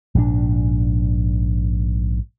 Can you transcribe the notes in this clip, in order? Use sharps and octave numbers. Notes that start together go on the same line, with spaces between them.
A#1 G#2 C#3 D4